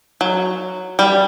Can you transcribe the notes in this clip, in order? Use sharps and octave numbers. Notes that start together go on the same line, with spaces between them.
F#3
G3